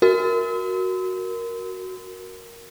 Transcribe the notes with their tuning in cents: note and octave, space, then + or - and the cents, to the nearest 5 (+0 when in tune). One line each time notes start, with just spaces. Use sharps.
F#4 +0 A#4 +0